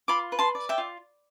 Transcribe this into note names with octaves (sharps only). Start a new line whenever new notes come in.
F4 B5 D6
B4
A5 C6
D5
E5 G5
F4